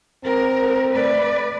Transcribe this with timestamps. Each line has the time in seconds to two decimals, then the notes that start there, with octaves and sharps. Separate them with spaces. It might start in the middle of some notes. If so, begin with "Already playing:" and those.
0.24 C4 A#4
0.92 A3 B4 D5